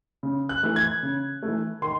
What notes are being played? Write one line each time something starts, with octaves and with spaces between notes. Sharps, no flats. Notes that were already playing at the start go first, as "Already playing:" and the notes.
C#3
F#6
E3 A3
G#6
C#3
E3 A3
D#3 C6